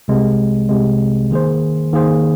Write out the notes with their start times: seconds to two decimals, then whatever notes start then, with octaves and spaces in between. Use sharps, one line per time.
0.08 C2 C3 G#3
0.69 C2 C3 G#3
1.31 D#3 A#3 G#4 C5
1.93 D#3 A#3 G#4 C5